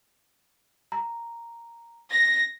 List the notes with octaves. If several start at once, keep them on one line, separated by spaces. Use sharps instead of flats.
A#5
A#6